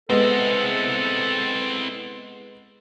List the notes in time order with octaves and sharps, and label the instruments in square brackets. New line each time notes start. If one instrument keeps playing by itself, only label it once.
[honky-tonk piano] G#3 B3 [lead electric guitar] C4 E4 [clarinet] A4